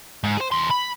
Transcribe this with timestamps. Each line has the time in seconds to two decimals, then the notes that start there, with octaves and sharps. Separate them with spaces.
0.24 G#2
0.37 G#4 C5
0.52 E2 C6
0.71 B5